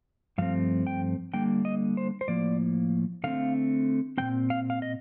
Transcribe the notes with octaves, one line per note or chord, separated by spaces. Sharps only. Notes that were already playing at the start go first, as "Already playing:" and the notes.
G2 F3 A3 C4 F5
G5
D3 G3 A#3 G5
D#5
C5
C5
A2 F3 A#3 D5
D3 A3 C4 F5
A#2 F3 C4 G5
F5
F5
D#5